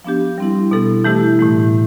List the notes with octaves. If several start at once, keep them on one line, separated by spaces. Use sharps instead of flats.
F3 B3 D4 G4
G3 C4 E4
B2 B3 E4 A4
E3 A3 E4 G4
A2 E3 A3